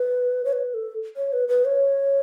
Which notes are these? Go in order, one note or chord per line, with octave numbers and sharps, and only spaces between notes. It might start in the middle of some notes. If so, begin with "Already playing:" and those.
Already playing: B4
C#5
B4
A4
C#5
B4
B4
C#5